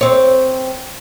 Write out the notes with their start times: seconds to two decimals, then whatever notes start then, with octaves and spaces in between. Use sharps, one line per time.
0.01 C4 C#5